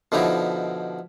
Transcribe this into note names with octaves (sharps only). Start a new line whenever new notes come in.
B2 D3 F3 D#4 E4 G4